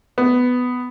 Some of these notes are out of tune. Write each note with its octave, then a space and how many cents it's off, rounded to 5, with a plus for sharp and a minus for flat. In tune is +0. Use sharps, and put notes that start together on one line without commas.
B3 +10